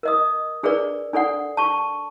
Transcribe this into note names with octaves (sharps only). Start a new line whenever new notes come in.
A#4 D#5 D#6
D4 G#4 A#4 B4 D5
D4 A4 D5 F#5
A5 C#6